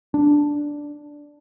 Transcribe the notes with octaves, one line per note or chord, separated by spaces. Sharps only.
D4